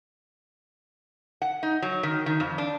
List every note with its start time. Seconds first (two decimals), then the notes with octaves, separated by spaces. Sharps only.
1.42 F#5
1.63 D#4
1.82 F#3
2.03 D#3
2.26 D#3
2.40 F2
2.58 D4